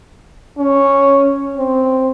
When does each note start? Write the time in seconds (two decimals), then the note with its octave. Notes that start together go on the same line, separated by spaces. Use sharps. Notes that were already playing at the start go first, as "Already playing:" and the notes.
0.58 C#4
1.57 C4